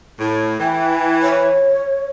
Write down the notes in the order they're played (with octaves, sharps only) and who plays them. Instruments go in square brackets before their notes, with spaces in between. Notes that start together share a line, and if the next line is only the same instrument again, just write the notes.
[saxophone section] A2
[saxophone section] E3 [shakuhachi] G5
[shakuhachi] C#5